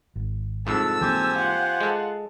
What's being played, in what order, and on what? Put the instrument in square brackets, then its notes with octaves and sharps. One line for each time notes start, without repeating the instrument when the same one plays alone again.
[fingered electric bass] G#1
[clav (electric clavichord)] C2 F2 G#2 [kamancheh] A4 E6
[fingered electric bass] E3 A#3 C4 [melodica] G4 C5 G#5
[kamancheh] F4 F#5
[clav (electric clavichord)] G#3 A4